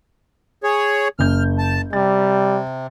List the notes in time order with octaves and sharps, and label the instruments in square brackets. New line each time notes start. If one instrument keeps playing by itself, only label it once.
[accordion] G#4 C#5
[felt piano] F#1 G6 [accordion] F6
[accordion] A5
[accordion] C3 [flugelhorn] G3 [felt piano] A6